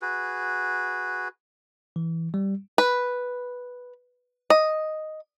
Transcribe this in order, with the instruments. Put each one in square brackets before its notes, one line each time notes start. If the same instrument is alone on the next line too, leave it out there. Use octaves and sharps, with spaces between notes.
[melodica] F#4 G#4 B4
[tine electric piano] E3
G3
[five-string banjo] B4
D#5